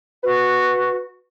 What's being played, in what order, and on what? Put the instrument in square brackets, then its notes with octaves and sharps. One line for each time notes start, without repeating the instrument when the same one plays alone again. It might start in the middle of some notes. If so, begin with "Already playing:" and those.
[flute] F#4 [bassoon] B4